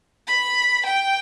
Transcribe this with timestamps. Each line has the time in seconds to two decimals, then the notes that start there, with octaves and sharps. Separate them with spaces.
0.27 B5
0.86 G5